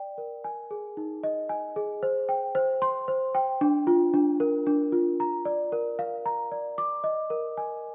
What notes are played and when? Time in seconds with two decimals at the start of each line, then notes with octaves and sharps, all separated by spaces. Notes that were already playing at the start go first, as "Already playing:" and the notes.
Already playing: D5 G5
0.18 A#4
0.44 G#5
0.71 G#4
0.97 D#4
1.23 D#5
1.49 G#5
1.76 G#4
2.03 C5
2.29 G5
2.55 C5
2.82 C6
3.08 C5
3.35 G5
3.61 D4
3.87 F4
4.14 D4
4.40 A#4
4.67 D4
4.92 F4
5.20 A#5
5.45 D5
5.72 A#4
5.99 F5
6.26 A#5
6.52 D5
6.78 D6
7.04 D#5
7.30 A#4
7.57 G#5